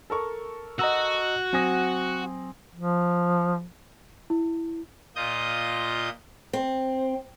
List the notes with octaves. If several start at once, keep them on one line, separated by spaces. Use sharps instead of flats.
A4 A#4 C#6
F#4 D#5 A#5 E6
F#3 C4 G#5 D#6 A#6
F3
E4
A#2 F4 D#5 D#6 G6
C4